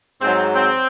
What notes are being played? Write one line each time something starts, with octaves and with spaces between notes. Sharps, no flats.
G#2 C4
F#3
C4